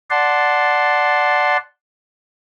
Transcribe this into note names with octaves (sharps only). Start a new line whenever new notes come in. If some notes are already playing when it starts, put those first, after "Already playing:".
D5 F#5 A5 C6